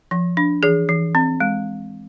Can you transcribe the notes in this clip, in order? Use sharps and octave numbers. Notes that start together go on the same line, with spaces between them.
F3
D4
E3 G#4
E3
C4
G#3